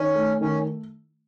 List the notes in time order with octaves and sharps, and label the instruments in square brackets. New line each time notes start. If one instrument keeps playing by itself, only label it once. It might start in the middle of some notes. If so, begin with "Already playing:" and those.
Already playing: [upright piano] D#3 D#4 [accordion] C#4
[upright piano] A3
[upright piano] D#3 [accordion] C#4